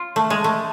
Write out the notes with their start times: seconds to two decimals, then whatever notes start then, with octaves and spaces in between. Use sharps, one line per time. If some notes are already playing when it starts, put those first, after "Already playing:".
Already playing: F4
0.16 A3
0.30 G#3
0.44 A3